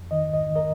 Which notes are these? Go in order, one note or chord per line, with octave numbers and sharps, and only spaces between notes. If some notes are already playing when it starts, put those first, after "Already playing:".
Already playing: F2
D#3 D#5
G#2
D#5
D#3
A#4 D#5